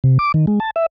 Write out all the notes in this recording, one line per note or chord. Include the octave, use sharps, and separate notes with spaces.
C3
D6
D#3
G#3
A5
E5